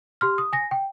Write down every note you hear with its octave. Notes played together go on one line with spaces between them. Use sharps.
G4 C6 F6
D#6
G#5 A#6
G5